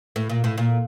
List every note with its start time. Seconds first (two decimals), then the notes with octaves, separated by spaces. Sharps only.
0.16 A2
0.30 A#2
0.44 A2
0.58 A#2